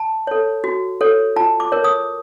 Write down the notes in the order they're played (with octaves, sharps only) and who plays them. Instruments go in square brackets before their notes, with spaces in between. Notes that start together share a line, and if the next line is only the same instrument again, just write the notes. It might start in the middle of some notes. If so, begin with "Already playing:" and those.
Already playing: [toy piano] A5
A4 C#5
F#4
A4 C#5
F4 A5
D6
A#4 C#5
D#6